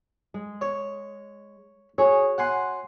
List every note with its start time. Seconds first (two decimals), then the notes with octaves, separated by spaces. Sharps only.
0.34 G#3
0.61 C#5
1.98 F#4 G#4 C#5
2.38 F#5 G#5 C6